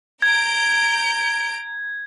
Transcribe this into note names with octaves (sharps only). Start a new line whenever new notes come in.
A#5 G6 G#6 D7